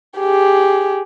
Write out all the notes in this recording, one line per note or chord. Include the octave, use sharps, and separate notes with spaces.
G4 G#4